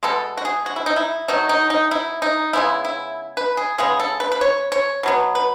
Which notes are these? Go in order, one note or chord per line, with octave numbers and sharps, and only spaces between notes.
B2 G#3 B3 A4
F#4
G#4
F#4
E4
D#4
E4
D#3 F#3 A3 D#4
D#4
D#4
E4
D#4
C#3 G#3 B3 E4
E4
B4
G#4
C#3 G#3 B3 G#4
A4
B4
B4
C#5
C#5
B2 F#3 B3
B4